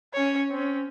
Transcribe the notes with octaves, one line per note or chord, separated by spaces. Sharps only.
C#4 C#5
C4 C#4